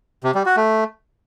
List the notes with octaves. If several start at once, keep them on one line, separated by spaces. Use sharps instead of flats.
C3
G3
F#4
A3